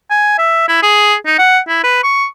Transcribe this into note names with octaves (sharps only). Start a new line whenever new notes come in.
G#5
E5
E4
G#4
D#4
F#5
E4
B4
C#6